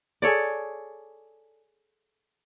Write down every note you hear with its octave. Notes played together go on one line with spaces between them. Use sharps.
G#4 A4 C#5 D5